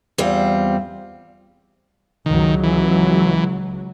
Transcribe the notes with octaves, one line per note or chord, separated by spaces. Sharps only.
E2 G3 C4 F4
C#2 D#3 F#3
E3